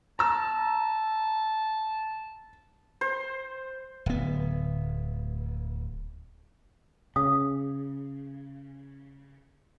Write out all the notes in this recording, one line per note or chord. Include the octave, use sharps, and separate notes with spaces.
A5 A#5 E6
C5
D1 B3
C#3 D#6